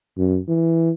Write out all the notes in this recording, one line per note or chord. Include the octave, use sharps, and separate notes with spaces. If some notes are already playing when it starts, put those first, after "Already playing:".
F#2
E3